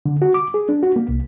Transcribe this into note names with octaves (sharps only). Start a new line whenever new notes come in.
D3
F#4
D6
G#4
D4
F#4
A#3
C2